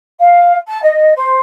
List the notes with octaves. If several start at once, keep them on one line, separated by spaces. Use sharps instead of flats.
F5
A5
D#5
C5